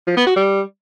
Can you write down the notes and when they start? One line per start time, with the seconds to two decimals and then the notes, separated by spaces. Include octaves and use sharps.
0.07 F3
0.17 B3
0.26 F#4
0.36 G3